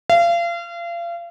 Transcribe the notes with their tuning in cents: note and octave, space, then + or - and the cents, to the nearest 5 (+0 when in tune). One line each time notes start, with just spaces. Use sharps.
F5 -35